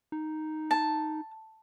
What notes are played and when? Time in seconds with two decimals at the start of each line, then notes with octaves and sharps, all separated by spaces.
0.12 D#4
0.71 A5